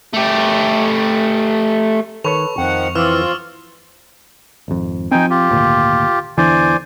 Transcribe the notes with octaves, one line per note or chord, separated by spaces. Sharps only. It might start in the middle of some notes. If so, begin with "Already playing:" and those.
A3 G4
D#3 A4 B4 C#5 C#6 F7
F2 D#3 F3 F#5 G5
E3 C4 F4 D6 E6 F6
G#1 F2
F3 C4 D#4 G5 G#5
F4 G4
G#1 D2 A#2
E2 D3 E3 C5 D5 G#5